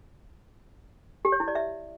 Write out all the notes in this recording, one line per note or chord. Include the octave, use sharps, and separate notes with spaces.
G4
C#5
E4
D5
E5